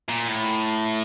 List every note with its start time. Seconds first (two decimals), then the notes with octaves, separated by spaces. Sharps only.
0.09 A#2
0.28 A2